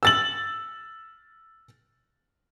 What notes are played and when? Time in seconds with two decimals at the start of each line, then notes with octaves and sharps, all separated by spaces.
0.03 E6 A6 F#7